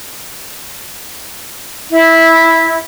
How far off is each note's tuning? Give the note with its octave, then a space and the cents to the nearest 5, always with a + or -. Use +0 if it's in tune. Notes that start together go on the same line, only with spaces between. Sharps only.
E4 -10